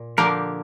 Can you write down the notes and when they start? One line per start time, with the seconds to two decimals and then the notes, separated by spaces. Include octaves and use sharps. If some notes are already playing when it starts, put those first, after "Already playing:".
Already playing: A#2
0.17 D3 F3 A#3 G4 A#4